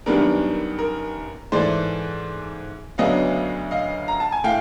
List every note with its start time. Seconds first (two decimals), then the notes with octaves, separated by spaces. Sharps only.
0.06 F#2 D#3 G3 B3 D4 A#4
0.79 A#4
1.52 G#2 E3 A3 C5 D5
2.98 D2 C#3 F#3 B3 D4 D#5 F5
3.71 D#5 F5
4.08 A#5
4.20 A5
4.32 G#5
4.44 A2 F5 G5